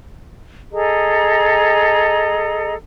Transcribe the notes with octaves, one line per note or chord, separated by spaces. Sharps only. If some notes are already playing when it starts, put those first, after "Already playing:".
G#4 A4 D#5 A#5